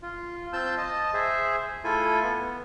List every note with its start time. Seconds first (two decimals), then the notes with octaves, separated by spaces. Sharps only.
0.02 F4
0.53 C4 F4 A5 E6 G6
0.77 D#5 A5
1.14 G#4 C5 E5
1.84 A3 E4 F4 A4 G#5
2.23 B3